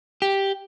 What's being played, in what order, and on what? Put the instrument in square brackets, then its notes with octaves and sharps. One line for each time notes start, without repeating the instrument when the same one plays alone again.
[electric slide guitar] G4